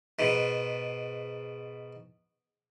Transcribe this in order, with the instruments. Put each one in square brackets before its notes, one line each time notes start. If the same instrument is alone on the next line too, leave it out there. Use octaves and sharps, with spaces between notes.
[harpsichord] G#2 B2